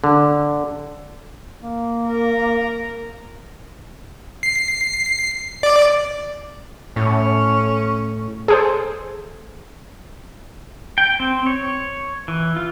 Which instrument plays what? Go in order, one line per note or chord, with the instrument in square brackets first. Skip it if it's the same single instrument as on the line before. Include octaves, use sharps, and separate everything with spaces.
[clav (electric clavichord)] D3
[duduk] A#3
[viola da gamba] A#4
[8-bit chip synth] C7
D5
[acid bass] A2 [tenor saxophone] C#4
[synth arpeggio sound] G#4 A4 C5
[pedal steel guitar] G5
C4
C#5
E3
F4